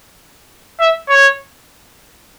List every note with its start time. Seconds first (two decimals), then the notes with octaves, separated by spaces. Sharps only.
0.80 E5
1.09 C#5